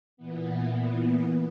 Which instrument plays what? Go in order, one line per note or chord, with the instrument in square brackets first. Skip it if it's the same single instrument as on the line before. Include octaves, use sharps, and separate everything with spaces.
[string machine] A#2 E3 B3